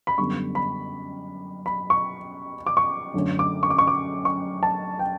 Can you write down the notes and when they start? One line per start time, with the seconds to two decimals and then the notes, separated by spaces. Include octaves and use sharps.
0.07 B5
0.18 F#2 D3 G3 B3 C#6
0.55 B5
1.66 B5
1.90 C#6
2.67 D6
2.77 C#6
3.14 F#2 D3 A3 C#4
3.39 D6
3.63 C#6
3.70 D6
3.78 C#6
3.87 D6
4.25 C#6
4.63 A5
4.99 G5